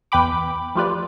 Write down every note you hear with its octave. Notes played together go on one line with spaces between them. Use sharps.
E2 B4 G5 B5 D6
F3 A3 F4 G4 B4 D5